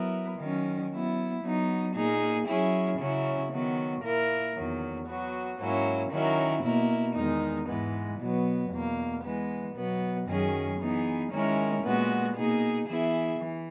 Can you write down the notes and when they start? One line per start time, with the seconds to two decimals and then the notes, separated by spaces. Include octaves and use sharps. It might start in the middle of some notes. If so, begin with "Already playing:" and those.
Already playing: F#3 B3 E4 A#4
0.38 D#3 F#3 C#4
0.91 F#3 B3 E4
1.43 F#3 B3 D#4
1.94 A#2 A#3 D#4 G#4
2.46 F#3 C#4 E4 G#4
2.98 C#3 F#3 C#4 E4
3.51 D#3 F#3 B3
4.02 A#2 A#3 E4 A#4
4.54 E2 D#3 F#3
5.07 F#3 B3 F#4
5.59 G#2 F#3 A#3 C#4 E4
6.10 D#3 F#3 C#4 E4 A#4
6.62 B2 A#3 E4 A#4
7.15 E2 D#3 G#3 D#4
7.67 G#2 E3 G#3 B3
8.19 B2 F#3 B3
8.71 E2 B2 A#3
9.22 E3 G#3 B3
9.75 B2 F#3 B3
10.27 F#2 D#3 F#3 C#4 G#4
10.79 E3 B3 D#4 G#4
11.31 D#3 G#3 C#4 E4 A#4
11.83 A#2 G#3 B3 F#4
12.36 B2 A#3 D#4 G#4
12.88 E3 B3 E4 G#4
13.39 E3